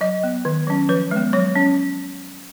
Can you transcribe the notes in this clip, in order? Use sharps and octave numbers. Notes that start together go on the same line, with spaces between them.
F#3 D#5
B3
D#3
F#3 C#4
F3 B4
G#3 B3
F#3 C#5
C#4